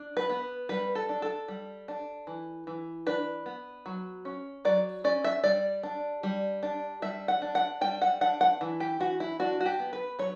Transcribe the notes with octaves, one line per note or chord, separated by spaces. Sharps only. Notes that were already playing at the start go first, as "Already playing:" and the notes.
Already playing: D4
B4
B3
G3 B4
A4
D4
A4
G3
D4
E3
E3
D4 B4
B3
F#3
C#4
F#3 D5
C#4 D5
E5
G3 D5
D4
G3
D4
G3 E5
F#5
D4
F#5
G3 G5
F#5
D4 F#5
F#5
E3
G4
E3 F#4
E4
D4 F#4
F#4
G4
B3
B4
F#3 C#5